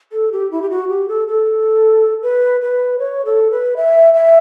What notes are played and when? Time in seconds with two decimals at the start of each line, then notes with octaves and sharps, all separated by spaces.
0.12 A4
0.32 G4
0.51 E4
0.62 G4
0.70 F#4
0.89 G4
1.08 A4
1.28 A4
2.22 B4
2.62 B4
2.99 C#5
3.25 A4
3.51 B4
3.77 E5
4.14 E5